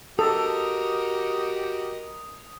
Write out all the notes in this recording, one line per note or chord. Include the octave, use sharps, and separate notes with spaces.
F#4 G4 A4 A#4 D#5 D#6